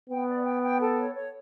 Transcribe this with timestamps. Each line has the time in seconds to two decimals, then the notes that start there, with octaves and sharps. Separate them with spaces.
0.09 B3 G5
0.28 D5
0.45 G5
0.62 G5
0.80 A4
0.98 C#5
1.15 C#5